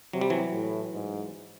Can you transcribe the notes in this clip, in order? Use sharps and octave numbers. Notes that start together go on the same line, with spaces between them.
C3 F#3
G3
E3 F#3
A2
G#2